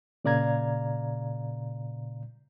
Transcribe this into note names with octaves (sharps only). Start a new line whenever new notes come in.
A#2 C#3 D5 F5 A#5 G#6